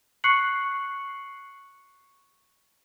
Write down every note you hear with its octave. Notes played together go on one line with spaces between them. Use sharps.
C#6 F#6 C7 C#7 F#7